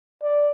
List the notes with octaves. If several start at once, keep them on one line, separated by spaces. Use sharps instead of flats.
D5